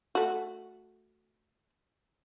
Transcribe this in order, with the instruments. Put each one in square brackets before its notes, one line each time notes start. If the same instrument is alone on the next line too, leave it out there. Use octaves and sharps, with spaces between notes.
[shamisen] A3 F#4